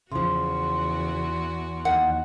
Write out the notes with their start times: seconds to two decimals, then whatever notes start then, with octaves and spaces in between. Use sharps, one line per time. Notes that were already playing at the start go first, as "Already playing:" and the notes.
0.12 E2 C#3 F3 F#4 C6
1.85 D#2 F#5